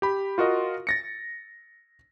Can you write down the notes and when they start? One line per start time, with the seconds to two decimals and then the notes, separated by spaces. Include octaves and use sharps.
0.02 G4 B5
0.38 F4 F#4 A#4 D#5
0.87 A6 A#6 C#7